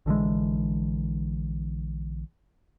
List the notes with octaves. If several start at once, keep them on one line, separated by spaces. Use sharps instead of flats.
A#1 D3 E3 G#3